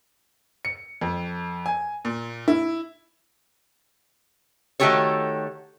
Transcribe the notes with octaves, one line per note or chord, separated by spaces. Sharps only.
C#7
F2
G#5
A#2
E4
D#3 A3 F#4 G4 A4 C#5